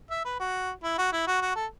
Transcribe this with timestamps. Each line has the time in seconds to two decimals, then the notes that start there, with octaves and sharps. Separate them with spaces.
0.10 E5
0.25 B4
0.40 F#4
0.83 E4
0.98 F#4
1.12 E4
1.27 F#4
1.41 F#4
1.56 A4